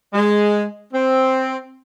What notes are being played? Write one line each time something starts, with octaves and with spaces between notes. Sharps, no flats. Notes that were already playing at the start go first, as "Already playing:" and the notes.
G#3
C4